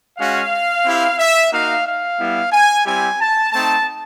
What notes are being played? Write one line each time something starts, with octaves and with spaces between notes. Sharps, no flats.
G#3 C#4 F#4 F5
C4 E4 G4
E5
A#3 D#4 F#4 F5
F5
G3 B3 E4
G#5
G3 C4 E4 G4 G#5
A5
A3 C4 D#4 A5